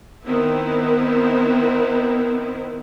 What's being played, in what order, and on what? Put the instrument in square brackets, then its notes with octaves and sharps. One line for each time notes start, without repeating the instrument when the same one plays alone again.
[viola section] D#3 B3 C4 E4